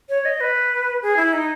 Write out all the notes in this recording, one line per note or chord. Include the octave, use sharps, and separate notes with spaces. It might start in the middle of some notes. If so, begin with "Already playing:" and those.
C#5
D#5
B4
G#4
E4
D#4